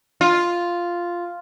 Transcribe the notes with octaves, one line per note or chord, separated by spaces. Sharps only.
F4